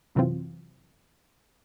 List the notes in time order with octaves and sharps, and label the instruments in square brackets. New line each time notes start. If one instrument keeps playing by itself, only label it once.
[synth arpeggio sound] F#2 C3 E3 F#3 C4 F4